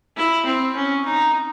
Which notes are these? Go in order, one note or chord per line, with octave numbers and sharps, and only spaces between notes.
E4
C4
C#4
D#4